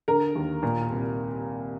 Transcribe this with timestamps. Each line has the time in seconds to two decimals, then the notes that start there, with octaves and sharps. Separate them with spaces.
0.08 D3 A#4
0.35 D#2
0.63 A#2
0.90 C2